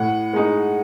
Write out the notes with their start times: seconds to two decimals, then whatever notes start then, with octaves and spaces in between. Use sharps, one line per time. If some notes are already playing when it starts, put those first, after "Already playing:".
Already playing: A2 F#5
0.33 G#3 D#4